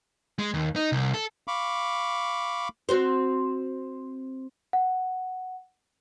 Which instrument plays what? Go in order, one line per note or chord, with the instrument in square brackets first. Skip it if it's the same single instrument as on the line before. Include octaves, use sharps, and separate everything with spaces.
[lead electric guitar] G#3
D#2
D#4
C2
A4
[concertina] F5 B5 C#6 D6
[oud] C4 F#4 C5
[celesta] F#5